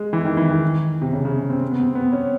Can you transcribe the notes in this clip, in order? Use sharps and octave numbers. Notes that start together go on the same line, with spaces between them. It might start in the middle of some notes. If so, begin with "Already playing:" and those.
Already playing: G#3
E3
D#3
E3
D#3
C3
C#3
C#3
C4
B3
C4
B3
C#4